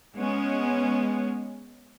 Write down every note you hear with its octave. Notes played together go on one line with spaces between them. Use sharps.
G#3 B3 C#4